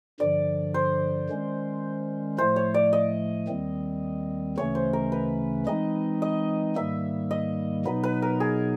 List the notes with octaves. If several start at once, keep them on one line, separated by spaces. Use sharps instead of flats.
G2 D3 F3 D5
C5
D#3 G#3 C#4
A2 F3 A3 C5
C#5
D5
D#5
D#2 D#3 G3 C4
D2 C#3 E3 A3 C#4 C#5
C5
A#4
B4
E3 G#3 C4 D#4 D#5
D#5
G#2 D#3 G3 A#3 E5
D#5
B2 F#3 B3 D#4 B4
B4
A#4
G#4